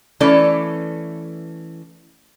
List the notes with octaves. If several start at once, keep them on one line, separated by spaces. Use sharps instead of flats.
E3 A3 C#4 A4 D5